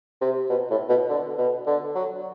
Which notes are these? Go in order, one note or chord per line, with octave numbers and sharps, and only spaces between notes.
C3
B2
A2
B2
D3
B2
D3
F#3